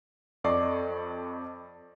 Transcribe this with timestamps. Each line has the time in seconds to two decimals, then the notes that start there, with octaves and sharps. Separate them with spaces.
0.44 F2 A4 D5 D#5 C#6 C7